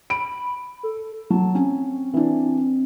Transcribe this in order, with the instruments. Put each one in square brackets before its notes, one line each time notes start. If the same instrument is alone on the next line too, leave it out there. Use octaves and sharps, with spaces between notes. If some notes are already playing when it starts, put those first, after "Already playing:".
[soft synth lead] B5 [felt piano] D7
[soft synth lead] A4
[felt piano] F#3 [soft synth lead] A5
[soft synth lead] C4 [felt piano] C#4
[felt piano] E3 D4 [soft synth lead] C4